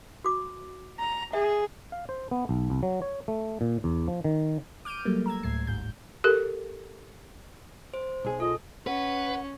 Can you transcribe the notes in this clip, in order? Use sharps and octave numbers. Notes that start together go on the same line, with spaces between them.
F#4 D6
A#5
G#4 E5
F5
C5
B3
B1
C2
F#3
C#5
A3
A#2
E2
F3
D#3
D6 F6 G6 D7 D#7
F#3 G3 A3 A#3
A#5 E6 G#6
D2 A2 G#6 C7
G1 G#2 G6
G4 A4 A#4
C5
B1 G#4
F4 A4 D#5
C#4 B4 F#5